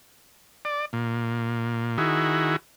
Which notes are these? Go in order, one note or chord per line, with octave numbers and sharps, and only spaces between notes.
D5
A#2
D#3 E4 F#4 G#4